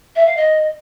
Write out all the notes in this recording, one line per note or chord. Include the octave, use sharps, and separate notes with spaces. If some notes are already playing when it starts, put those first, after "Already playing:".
E5
F5
D#5